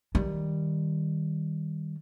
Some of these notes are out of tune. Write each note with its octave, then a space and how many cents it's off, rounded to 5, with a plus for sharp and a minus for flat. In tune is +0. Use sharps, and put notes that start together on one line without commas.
D#3 +10 G3 +5